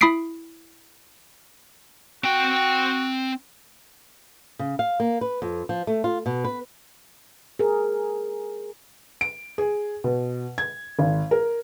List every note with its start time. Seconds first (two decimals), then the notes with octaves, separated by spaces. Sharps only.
0.01 E4 B5 D#6 B6 C7 D7
2.24 C4 F#4 G5
4.59 C#3
4.79 F5
5.00 A#3
5.21 B4
5.42 F2
5.69 F3
5.87 A3
6.04 F4
6.26 B2
6.44 B4
7.59 G#4 A#4
9.21 D7
9.58 G#4
10.04 B2
10.58 G#6
10.99 G#1
11.31 A#4